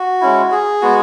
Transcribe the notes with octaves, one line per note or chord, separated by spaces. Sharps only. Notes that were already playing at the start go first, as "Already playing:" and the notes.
Already playing: F#4
G#3 C#4 E4
G#4
G#3 B3 F#4